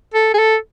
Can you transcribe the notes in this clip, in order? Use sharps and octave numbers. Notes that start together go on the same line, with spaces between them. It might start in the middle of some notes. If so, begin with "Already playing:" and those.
A4
G#4
A4